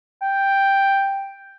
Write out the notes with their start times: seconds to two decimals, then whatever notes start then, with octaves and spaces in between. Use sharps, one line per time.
0.22 G5